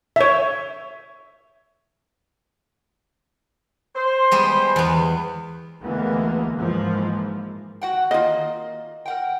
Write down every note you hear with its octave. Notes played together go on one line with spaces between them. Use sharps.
C#5 E5
C5
G3 G#3 B3
E2 B3
D2 D3 E3 G#3 A#3 B3
G#2 E3 F3 A#3
F#4 F#5 G5
D#3 A#3 F4 D#5
A#4 F#5 G5